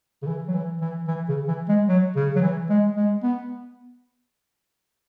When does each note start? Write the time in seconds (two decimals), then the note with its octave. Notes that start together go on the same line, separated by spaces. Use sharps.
0.22 C#3
0.27 E3
0.48 F#3
0.54 E3
0.81 E3
1.08 E3
1.29 C#3
1.48 E3
1.69 G#3
1.89 F#3
2.16 C#3
2.36 F#3
2.42 E3
2.70 G#3
2.96 G#3
3.23 B3